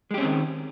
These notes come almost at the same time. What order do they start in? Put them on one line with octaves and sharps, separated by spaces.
G#3 G4 C#4 C4 D#3